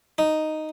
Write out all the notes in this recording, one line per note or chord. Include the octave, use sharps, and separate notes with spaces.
D#4